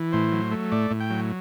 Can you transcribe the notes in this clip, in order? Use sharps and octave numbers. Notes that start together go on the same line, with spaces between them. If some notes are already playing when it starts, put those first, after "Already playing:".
Already playing: E3
A2 C5
F#3
A3
A2 D5
A2
G5
F#3